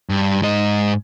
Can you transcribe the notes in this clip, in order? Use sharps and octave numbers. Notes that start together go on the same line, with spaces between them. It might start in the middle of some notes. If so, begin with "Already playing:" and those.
G2
G#2 D#5